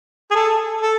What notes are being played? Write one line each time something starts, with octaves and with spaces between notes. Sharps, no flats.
G#4
A4
A4